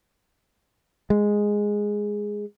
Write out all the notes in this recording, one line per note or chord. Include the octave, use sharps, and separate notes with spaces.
G#3